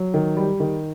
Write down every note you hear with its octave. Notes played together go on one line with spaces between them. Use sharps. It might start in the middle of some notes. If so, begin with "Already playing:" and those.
Already playing: F#3
D#3
G3
D#3